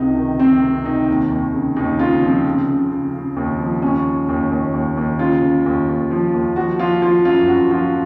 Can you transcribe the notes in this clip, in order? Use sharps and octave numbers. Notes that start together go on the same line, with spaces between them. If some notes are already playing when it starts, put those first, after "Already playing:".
Already playing: C#2 C3 D#4
D#3
C3 C4
C3
D#3 D#4
D#2
D#2
C#3
D#2 D#4
C#3 F4
F3 C4
C#3
C#3
C#3
C#3
D#2
F3
D#2 C#4
C#3
D#2
D#2
D#2
D#2
C#3 F4
C#3
D#2
D#2
F3
D#2
F3 F#4
F3 F4
F3 F4
F#2 F4
F#2 F#4
F3 F4